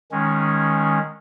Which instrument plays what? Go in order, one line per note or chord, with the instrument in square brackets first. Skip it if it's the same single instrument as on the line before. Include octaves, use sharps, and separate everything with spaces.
[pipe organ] D#3 G#3 C#4